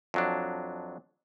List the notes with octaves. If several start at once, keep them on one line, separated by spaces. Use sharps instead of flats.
F2 F#3 D4